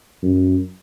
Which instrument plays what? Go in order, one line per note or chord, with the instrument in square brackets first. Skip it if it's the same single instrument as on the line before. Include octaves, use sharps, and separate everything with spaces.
[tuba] F#2